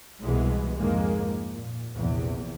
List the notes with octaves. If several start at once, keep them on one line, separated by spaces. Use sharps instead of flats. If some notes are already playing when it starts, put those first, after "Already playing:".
C2 B2 E3 G#3 B3
F2 G#2 D#3 G#3 A#3
A#2
A#1 E2 C3